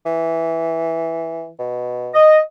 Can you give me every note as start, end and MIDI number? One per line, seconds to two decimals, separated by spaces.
0.06 1.50 52
1.59 2.14 47
2.14 2.39 75